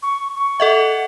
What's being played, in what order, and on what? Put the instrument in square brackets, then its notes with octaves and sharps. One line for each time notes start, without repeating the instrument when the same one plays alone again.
[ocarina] C#6
C#6
[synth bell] A4 D#5 E5 [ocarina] F#5